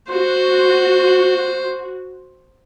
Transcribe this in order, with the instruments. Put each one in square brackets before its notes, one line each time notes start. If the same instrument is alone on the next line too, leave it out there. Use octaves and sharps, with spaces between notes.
[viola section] F#4 [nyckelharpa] C5